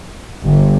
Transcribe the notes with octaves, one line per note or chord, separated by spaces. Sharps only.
G1